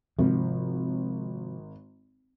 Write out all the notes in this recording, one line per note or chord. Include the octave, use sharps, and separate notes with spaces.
G#1 C3 F3